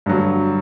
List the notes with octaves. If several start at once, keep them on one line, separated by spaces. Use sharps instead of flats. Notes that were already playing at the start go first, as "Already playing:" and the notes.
G2 D3 F#3